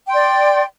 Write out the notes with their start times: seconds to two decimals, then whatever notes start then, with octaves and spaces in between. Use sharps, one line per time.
0.06 G5
0.10 C6
0.13 D5